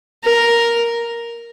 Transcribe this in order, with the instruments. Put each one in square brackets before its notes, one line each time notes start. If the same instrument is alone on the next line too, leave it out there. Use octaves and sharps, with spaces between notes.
[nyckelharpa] A#4